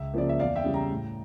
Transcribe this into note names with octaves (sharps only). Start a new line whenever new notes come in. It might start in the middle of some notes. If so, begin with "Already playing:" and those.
Already playing: C#2 E5
C#3 F3 A#3 D5
E5
E2 D5 F5
E5 G5
C#3 G3
G5 A#5
A2